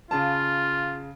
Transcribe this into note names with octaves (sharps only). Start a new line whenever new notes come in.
C#3 F4 F5 A5